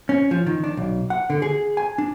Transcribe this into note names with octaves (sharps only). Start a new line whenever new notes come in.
C#4
F3
D#3
D4
B1
F#5
D3
G#4
G#5
D4